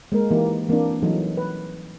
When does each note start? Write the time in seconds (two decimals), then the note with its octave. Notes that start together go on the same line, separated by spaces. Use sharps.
0.12 G#3 A#3 A#4
0.31 E3 A#3 D#4 G4
0.69 E3 A#3 C4 D4
1.02 E3 F#3 G3 D#4 A4
1.37 B4